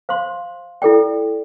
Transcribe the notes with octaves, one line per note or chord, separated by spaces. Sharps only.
C5 F5 C6
E4 A4 D5 G5